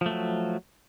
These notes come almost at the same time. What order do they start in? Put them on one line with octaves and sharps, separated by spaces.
F3 A3 F#3